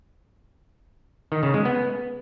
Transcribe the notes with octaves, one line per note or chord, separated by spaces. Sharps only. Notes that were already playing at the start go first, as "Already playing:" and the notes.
D#3
C#3
G#3
B3